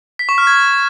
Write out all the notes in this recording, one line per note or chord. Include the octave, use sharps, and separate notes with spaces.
B6
C#6
F6
G#6